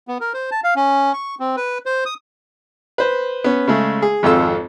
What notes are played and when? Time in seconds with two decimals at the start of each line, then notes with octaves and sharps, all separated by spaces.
0.08 B3
0.21 A#4
0.34 C5
0.51 A5
0.64 F5
0.76 C#4
1.13 C#6
1.40 C4
1.57 B4
1.86 C5
2.06 D#6
2.98 B4 C5
3.44 B3 C#4
3.68 C#3 G#3 A3
4.02 G#4
4.23 G#1 F2 F4 A4 E6